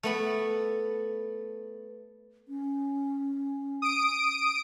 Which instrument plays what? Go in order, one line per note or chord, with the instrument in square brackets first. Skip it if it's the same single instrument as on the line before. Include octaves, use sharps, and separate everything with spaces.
[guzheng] A3 B3 B5
[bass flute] C#4
[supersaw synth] D#6 D7